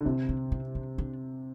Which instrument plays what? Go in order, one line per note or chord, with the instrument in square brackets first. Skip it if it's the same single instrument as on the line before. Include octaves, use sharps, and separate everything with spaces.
[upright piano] D3
[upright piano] C3 [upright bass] E4
[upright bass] D4
C4
D4
D4